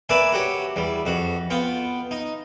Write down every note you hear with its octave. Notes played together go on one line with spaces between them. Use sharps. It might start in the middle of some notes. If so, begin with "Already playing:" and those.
A#3 B4 D5 E5 G#5
F#4 G4 C#5
E2 G3
F2 F#4
B3 F4 G5
D#4